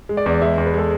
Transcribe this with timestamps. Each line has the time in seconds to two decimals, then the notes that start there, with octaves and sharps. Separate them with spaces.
0.09 G#3
0.17 D5
0.26 E2
0.42 G#3 E5
0.58 E2
0.66 B4
0.74 G#3 A4